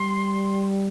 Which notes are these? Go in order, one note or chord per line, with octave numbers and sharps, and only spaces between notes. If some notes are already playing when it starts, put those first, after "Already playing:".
Already playing: G3 C6